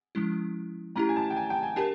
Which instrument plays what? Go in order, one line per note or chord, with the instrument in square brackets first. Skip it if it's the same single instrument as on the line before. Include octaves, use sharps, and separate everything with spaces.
[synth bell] F3 G#3 C#4 E4
[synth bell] A3 C#4 E4 G4 [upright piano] A#5
[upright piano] G#5
A5
G5
G#5
G5
G#5
[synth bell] D4 G4 A#4 [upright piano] A5